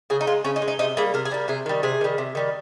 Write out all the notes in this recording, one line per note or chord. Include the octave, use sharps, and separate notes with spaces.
C#3 G#4
D#4
G#3 F4
C#3 C#4
D#4
G#3
D#4
C3 D#4
G3 A#3 G#4
C3 A#4
G#4
G3 A#3
C3 G#4
D#3 G3
C3 G#4
D#3 G3
C3
D#3 G3